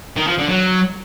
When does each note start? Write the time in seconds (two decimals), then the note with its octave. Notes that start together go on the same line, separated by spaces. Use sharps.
0.17 D#3
0.28 F3
0.38 D3
0.49 F#3